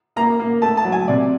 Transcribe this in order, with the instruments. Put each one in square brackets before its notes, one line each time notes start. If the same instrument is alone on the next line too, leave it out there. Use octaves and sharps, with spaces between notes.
[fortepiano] A#3 A#5
A#3
A3 A5
A5
F#3
G#5
C3 D5